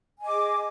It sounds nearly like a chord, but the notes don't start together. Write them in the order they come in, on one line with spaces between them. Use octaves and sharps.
G#5 D#5 D6 G#4